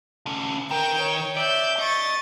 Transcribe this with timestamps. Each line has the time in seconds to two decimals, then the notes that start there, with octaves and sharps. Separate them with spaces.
0.26 D3 C#4
0.71 D#3 A#4 G5
1.02 C#5
1.36 D5 E5 G6
1.79 D#5 C#6 A6